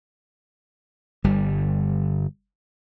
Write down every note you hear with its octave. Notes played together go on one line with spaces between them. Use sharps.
G1 G3